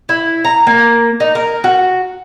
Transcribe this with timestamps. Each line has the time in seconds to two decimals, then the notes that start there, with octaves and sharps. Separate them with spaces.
0.09 E4
0.45 A#5
0.67 A#3
1.20 D#4
1.35 A#4
1.64 F#4